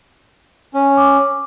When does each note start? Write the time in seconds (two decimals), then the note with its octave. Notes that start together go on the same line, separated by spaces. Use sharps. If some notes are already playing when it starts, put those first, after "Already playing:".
0.74 C#4
0.97 D6